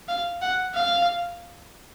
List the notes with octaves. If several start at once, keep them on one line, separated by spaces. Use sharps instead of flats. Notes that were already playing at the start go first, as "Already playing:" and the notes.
F5
F#5
F5